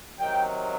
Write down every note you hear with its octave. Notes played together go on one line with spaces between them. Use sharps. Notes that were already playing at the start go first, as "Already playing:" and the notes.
C3 D#3 F#3 G5